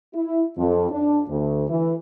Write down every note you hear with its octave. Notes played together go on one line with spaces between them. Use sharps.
E4
F2
D4
D2
E3